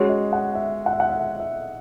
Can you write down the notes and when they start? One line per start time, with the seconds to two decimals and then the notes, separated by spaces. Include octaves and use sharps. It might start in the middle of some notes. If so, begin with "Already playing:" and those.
Already playing: G#3 C#4 F#4 C#5
0.09 D#5
0.33 F#5
0.55 E5
0.86 F#5
0.93 E5
1.00 F#5
1.09 E5
1.40 E5